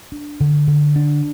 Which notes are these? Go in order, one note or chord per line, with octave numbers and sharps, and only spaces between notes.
D4
D3
D3
D4